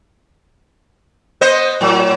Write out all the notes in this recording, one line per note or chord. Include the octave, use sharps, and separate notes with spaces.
B3 C5 D#5
A2 F#3